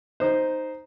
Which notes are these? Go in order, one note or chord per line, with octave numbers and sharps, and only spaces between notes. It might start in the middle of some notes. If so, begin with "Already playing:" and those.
D#4 C5